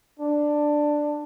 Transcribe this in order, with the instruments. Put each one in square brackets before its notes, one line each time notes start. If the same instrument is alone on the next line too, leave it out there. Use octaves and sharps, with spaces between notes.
[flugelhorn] D4